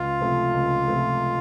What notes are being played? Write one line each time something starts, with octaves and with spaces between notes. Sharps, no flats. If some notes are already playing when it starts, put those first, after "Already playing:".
Already playing: C#2 F4
C3 F3 A3
C#2
C3 F3 A3